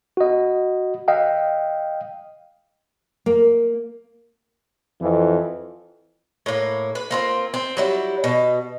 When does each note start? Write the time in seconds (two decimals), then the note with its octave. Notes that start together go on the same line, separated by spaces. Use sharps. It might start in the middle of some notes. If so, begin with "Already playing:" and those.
0.17 F#4 D#5
1.08 D#5 F5 G5
3.26 A#3
5.00 F2 E3
6.46 A2 A#3
6.95 B4
7.11 A#3 C4 F4
7.54 C4
7.77 F#3 G3 E4
8.24 B2